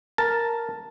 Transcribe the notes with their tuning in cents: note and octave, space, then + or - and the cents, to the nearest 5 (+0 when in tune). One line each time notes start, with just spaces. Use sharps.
A#4 +0 A5 +5